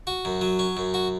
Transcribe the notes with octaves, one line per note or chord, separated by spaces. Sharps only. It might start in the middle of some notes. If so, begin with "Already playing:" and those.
F#4
F#2
F#3
C#4
F#2
F#4